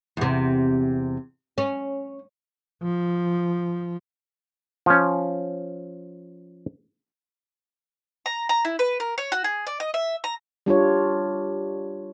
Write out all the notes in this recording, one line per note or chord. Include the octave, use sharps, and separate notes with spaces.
E2 C3
C#4
F3
F3 C#4
A#5
A#5
E4
B4
A#4
C#5
F#4
G#4
D5
D#5
E5
A#5
G3 D4 F4 C#5